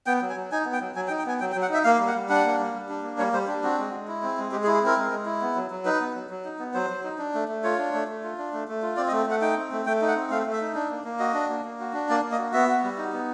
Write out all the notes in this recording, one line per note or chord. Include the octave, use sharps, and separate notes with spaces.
B3 G5
F#3
G#5
F#3
D#4 G#5
B3
G5
F#3
F#3 G#5
G5
D#4
G5
B3 G#5
F#3 G5
G5
F#3
F#5
D#4 E5
A#3 F5
G3
F#5
G3
D4 F#5
A#3
G3
G3
D4
A#3
G3 C#5
G3 C5
D4 G4
C4 F#4
G#3
G#3
E4
C4
G#3
G#3 G4
G#4
E4
G#4
C4 A#4
G#3
G#3
E4
B3
F#3
F#3
D#4 B4
B3
F#3
F#3
D#4
B3
F#3 C5
F#3
D#4
D4
A3
A3
F4 C#5
D4
A3
A3
F4
D4
A3
A3
F4
C4 D5
D#5
A3
A3 F#5
D#4 G5
C4
A3
A3 G5
D#4
F#5
C4
A3 F5
A3
E5
D#4
D4
A#3
A#3
F#4 D#5
D4
A#3
A#3
F#4
D4
A#3 D5
A#3
D#5
F#4
B3 E5
F#4
G3
D#4
B3